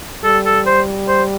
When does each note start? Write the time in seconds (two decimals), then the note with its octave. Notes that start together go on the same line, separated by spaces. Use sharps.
0.24 G3 A4
0.46 A4
0.66 C5
1.08 C5